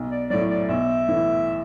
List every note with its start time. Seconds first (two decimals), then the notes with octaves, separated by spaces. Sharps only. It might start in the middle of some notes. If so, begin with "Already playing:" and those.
Already playing: B1
0.10 D5
0.30 A2 F#3 D5
0.49 D5
0.69 B1 E5
1.08 A2 E3